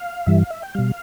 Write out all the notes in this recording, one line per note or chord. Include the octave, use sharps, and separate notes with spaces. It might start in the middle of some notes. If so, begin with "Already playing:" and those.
Already playing: F5
G2 E3 G3 E5
F5
E5
G5
B2 G3 F5